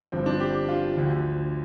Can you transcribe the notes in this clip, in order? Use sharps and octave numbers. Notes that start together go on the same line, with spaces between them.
G1 G2 F3 C4
D4
G4
G4
F4
D2 D3 F3